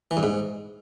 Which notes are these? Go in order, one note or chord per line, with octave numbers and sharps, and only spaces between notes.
E3
G2
G#2